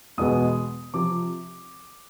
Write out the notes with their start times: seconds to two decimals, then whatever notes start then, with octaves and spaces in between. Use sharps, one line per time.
0.18 E2 B2 G#3 B3 D#6
0.94 C3 F3 D6